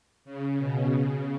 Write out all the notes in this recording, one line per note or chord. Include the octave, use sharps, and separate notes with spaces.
C#3
B2
C#3